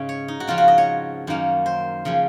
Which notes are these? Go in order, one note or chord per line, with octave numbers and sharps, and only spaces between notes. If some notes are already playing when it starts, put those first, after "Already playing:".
Already playing: G#2 C#3 G#3 C#4
C#5
D#4
F#4
C#3 F3 C4 F4
F#4
D#5
C#5
F#2 D#3 A#3 C#4
C5
C#3 F3 G#3